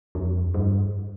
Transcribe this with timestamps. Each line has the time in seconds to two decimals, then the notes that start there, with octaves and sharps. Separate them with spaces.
0.15 F2
0.54 G2